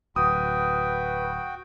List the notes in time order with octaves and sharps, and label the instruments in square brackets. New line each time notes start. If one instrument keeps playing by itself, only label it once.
[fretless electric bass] D1 [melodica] F#4 G5 [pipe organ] B4 [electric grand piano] D#6